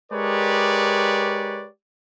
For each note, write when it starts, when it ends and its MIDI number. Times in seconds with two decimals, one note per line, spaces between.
0.12 1.66 56
0.12 1.66 67
0.12 1.66 70
0.12 1.66 71
0.12 1.66 73
0.12 1.66 74